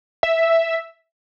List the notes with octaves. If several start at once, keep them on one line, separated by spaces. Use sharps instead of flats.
E5